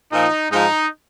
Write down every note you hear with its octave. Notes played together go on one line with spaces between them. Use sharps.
A#2 F3 D#4
G#2 F3 D#4